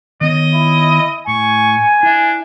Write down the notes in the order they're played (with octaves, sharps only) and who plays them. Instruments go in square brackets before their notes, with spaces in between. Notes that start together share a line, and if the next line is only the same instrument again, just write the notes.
[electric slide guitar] D#3 B3 C#5 [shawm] D#5
[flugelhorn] E4
[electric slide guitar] A2 [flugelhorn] G#5 [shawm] C#6
[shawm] D4 [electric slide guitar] E4 E5